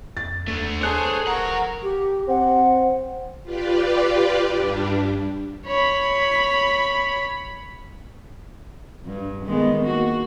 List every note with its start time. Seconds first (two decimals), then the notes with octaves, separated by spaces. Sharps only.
0.17 F2 A6
0.48 D#2 D3 A3
0.81 G#4 A4 C5 C#5 A5 F#6 C#7
1.27 D1 F#3 F#4 A#4 F#5 A#5
1.82 G4
2.28 C4 F#5
3.43 F4 G4 B4 D5
4.45 G2 G3 D4
5.67 C#5 B5
9.06 G2
9.46 D#3 G#3 B3
9.84 A#3 F#4